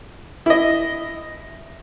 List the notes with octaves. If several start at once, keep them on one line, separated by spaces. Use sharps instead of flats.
E4 D#5